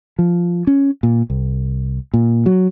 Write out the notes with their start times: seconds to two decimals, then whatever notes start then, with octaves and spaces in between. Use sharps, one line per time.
0.19 F3
0.67 C#4
1.03 A#2
1.30 C2
2.14 A#2
2.46 F#3